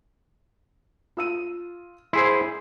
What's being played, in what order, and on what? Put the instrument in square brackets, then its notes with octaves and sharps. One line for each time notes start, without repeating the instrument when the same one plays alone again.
[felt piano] F4 E6 D#7
[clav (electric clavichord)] E4 G#4 C5 [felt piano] C6 E6